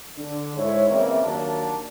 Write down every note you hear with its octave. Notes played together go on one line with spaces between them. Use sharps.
D3 D4
G#2 G#3 E4 C#5
E2 C#3 A#3 C4 D5 E5
D#2 F#3 A#3 D4 A5